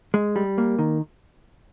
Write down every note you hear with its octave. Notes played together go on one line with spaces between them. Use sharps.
G#3
G3
A#3
D#3